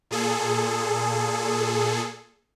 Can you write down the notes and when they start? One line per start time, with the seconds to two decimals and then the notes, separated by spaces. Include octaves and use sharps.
0.11 A#2 G#4 A4